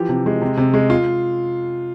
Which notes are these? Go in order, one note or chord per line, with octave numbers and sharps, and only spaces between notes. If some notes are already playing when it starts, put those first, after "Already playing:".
Already playing: E3 F3 G4
C3
G#3
C3
C3
G#3
F4